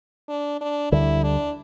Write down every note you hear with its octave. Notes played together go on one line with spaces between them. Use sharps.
D4
D4
D2 D3 G3 E4
D4